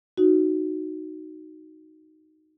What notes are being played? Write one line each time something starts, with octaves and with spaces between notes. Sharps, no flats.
D#4 F#4